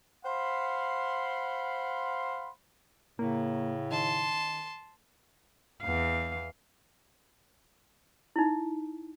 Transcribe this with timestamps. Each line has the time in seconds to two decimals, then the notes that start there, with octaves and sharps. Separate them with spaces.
0.25 C5 F5 F#5 B5 C6
3.19 A2 C#3 A#3
3.91 D#3 A5 C6
5.82 E2 F5
8.36 D#4 E4